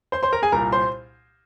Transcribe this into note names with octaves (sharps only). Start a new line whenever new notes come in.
C5 C6
C5 C6
A#4 A#5
G#4 G#5
C2 A#2 A#4 A#5
C5 C6